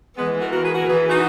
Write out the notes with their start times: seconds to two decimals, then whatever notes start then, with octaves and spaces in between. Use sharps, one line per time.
0.17 E3 G#3 B3
0.40 F#4 A#4
0.52 F#4 A#4
0.64 G#4 B4
0.74 F#4 A#4
0.86 E3 G#4 B4
1.08 D#4 F#4